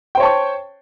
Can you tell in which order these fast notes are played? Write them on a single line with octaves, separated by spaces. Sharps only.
G5 C5 C#5 A5 C#6